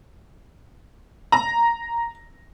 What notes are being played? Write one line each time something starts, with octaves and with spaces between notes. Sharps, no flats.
A#5